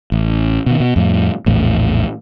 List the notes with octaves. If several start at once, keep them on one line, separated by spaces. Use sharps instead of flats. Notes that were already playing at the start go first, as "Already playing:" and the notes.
A1
B2 D#3
B2
F2 A2
A#1 E2 A2